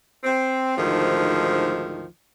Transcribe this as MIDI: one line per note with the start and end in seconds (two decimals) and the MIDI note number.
0.24 0.77 60
0.77 2.04 38
0.77 2.04 44
0.77 2.04 51
0.77 2.04 53